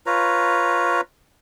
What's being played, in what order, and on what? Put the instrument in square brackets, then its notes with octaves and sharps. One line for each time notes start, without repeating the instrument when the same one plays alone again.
[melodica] F4 B4 C#5 A#5